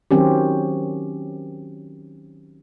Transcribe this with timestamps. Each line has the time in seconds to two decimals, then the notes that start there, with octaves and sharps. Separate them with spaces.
0.11 D#3 F#3 C4 C#4 G4